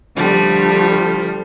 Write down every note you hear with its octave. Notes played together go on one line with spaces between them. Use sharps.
D3 F3 G3 A3